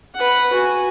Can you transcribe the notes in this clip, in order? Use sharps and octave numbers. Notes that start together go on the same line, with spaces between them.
B4 F#5
F#4 G#5